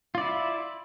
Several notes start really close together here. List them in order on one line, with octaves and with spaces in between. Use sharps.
F4 D5 E4